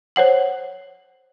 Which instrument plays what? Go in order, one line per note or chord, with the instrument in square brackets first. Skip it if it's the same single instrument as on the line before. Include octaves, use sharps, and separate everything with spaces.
[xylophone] C5 C#5 F#5 F#7